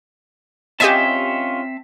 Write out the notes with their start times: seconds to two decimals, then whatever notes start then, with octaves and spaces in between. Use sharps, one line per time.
0.80 C4 C#4 F4 G4 D#5 E5 G#5 A5